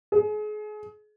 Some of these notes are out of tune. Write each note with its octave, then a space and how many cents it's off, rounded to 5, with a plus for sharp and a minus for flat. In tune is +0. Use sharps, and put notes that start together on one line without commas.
G#4 +35